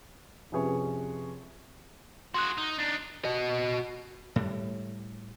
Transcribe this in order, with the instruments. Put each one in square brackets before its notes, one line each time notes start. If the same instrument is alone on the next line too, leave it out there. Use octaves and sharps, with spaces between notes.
[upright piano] F2 C3 C#4 G#4 B4 C#5
[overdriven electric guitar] F#4 G#4 [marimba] C6 F#6
[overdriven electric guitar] D#4
D4 D#4
F#4 D#5
[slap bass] A2 G3